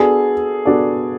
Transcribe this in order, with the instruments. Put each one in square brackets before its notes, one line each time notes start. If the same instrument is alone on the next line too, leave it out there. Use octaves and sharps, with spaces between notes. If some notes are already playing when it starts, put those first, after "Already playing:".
Already playing: [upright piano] B3 D4 F#4 A4 D5 [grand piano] G#4
[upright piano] B3 D4 F#4 A4 D5